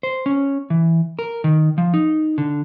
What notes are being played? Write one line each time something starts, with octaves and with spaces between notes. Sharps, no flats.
C5
C#4
E3
A#4
D#3
F3
D#4
D3